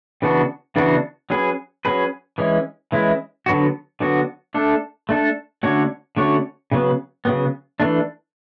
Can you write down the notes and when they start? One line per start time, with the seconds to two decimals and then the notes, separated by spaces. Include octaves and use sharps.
0.22 C#3 E3 B3 D4 F#4
0.76 C#3 E3 B3 D4 F#4
1.30 F#3 C#4 G#4 B4
1.85 F#3 C#4 G#4 B4
2.38 E3 G#3 C#4 E4
2.92 E3 G#3 C#4 E4
3.46 D3 F#3 B3 F#4
4.00 D3 F#3 B3 F#4
4.54 A3 D4 A4
5.09 A3 D4 A4
5.63 D3 A3 C#4 F#4 C#5
6.17 D3 A3 C#4 F#4 C#5
6.72 C#3 F#3 B3
7.25 C#3 F#3 B3
7.80 E3 A3 D4